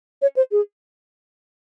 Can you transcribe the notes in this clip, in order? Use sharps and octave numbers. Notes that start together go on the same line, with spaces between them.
C#5
C5
G#4